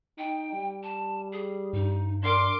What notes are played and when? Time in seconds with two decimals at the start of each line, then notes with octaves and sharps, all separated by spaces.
0.18 D#4 G5
0.53 G3
0.83 A5
1.32 G#4
1.73 G2 D#4
2.23 D4 A#4 C6 D6